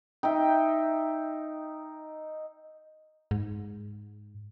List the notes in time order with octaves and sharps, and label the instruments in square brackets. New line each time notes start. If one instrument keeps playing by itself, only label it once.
[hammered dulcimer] D#4 E5 [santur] G5
[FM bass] G#2